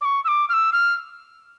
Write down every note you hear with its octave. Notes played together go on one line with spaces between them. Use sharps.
D6
C#6
E6
D6
F6
E6
F6